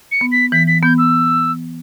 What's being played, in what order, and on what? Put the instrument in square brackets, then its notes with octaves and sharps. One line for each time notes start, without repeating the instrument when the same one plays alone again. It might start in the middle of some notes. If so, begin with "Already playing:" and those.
[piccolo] C#7
[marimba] B3
[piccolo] B6
[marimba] E3 [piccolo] B6
[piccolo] B6
[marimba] B3 [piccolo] G6
[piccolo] E6